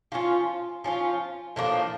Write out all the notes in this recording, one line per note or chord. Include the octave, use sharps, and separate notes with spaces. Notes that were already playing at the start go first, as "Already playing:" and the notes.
F3 C#4 F4
F3 C#4 F4
A2 F3 A#3 D4